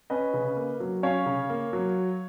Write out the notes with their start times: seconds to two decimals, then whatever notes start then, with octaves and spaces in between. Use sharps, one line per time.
0.10 C#4 B4 D#5
0.34 C#3
0.56 A#3
0.80 F#3
1.03 C#4 C#5 F5
1.26 C#3
1.50 A#3
1.73 F#3